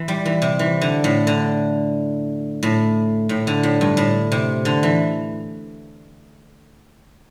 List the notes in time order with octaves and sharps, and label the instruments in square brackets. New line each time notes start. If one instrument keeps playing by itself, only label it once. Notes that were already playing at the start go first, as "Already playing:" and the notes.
Already playing: [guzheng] E3
G3
E3
C3
E3
D3
A2
D3
A2
A2
D3
A2
G2
A2
C3
D3
E3